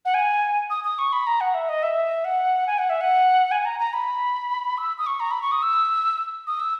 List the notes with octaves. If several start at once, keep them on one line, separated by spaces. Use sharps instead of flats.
F#5
G#5
D#6
D#6
C#6
B5
A#5
F#5
E5
D#5
E5
F#5
G#5
F#5
E5
F#5
G#5
A#5
A#5
B5
E6
D#6
C#6
A#5
B5
C#6
D#6
E6
D#6
E6